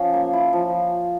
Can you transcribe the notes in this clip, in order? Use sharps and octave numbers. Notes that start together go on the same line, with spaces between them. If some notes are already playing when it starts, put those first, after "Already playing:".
Already playing: F3 C#4
A#3
E4
F3